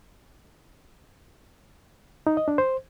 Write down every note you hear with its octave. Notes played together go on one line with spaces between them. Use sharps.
D#4
D#5
D4
C5